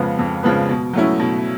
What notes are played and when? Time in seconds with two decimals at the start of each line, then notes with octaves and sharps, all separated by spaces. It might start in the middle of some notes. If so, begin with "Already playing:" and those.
Already playing: F2 C#3 F3 G#3 B3
0.19 F2
0.43 C#3 F3 G#3 B3
0.69 B2
0.93 F#3 A3 C#4 E4
1.20 B2